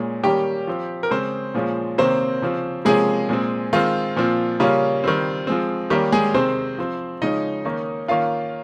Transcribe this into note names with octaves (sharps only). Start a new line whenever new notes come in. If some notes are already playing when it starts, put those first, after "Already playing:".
Already playing: A#2 G#3 C#4
D#3 G3 A#3 C#4 G4 G5
F3 C4
A#4
C#3 G#3 C4 C5
A#2 F3 G#3 C#4
C3 D#3 A#3 C4 C#4 C5
C#3 F3 C4
C3 F3 G#3 A#3 C#4 G#4
A#2 G#3 C4
D#3 G#3 C4 F4
A#2 F3 C4
C#3 G3 A#3 C#4 F4
D#3 G3 C4
F3 G#3 C4
D#3 G3 A#3 C#4 G4
G#3 G#4
C3 D#3 G#3 C4 C5
F3 C4
C#3 F3 G#3 C#4 D#4 D#5
D#3 A#3 C#4
D#3 A#3 C#4 F4 F5